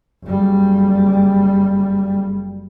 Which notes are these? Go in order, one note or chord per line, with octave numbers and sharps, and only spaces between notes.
F#1 G3